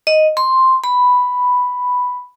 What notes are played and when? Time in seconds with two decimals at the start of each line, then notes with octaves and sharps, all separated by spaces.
0.07 D#5
0.37 C6
0.84 B5